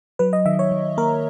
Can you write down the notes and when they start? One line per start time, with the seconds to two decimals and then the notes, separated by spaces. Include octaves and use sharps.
0.19 F#3 B4
0.33 D#5
0.45 D#3 E5
0.59 C#5
0.72 D#3
0.97 A#3 A#4